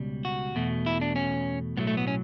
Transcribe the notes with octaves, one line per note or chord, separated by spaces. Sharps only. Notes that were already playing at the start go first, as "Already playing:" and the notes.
Already playing: C#2 B2 G3
F#4
E2 B2 A3
E4
D4
C#4
B1 A2 F#3 A3 B3
A3
B3
C#4